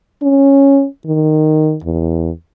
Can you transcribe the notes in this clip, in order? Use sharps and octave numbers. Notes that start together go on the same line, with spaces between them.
C#4
D#3
E2